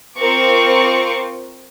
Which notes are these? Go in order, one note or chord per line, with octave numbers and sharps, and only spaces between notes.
C4 F4 A#4 C#6 D6